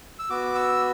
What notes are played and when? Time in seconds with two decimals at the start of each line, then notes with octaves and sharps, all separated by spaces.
0.19 E6
0.30 B3 F#4 D6
0.55 E6